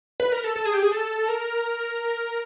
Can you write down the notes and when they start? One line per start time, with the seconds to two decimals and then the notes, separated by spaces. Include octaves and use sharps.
0.20 B4
0.32 A#4
0.44 A4
0.56 A4
0.65 G#4
0.74 G4
0.83 G#4
0.92 A4
1.28 A#4